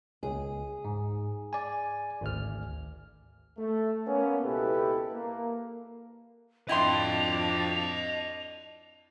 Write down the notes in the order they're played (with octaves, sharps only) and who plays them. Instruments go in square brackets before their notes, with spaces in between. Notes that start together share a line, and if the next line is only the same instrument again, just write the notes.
[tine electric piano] C#2 [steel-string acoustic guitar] G#4
[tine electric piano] G#2
D5 G#5
G#1 D2 F6
[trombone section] A3
A#3 B3 C#4
C#2 B2 E4 G4 A4 B4
A#3
[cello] F2 D4 [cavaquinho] E4 G5 C6 [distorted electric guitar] D#5 A5 [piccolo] F7